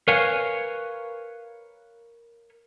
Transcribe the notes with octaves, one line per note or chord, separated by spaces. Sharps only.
A#4 B4 C#5 F5 G#5